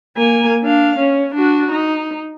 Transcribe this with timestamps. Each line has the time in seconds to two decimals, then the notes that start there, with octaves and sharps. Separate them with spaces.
0.17 A#3 G#5
0.64 D4 F5
0.98 C#4
1.34 D4 F#4
1.71 D#4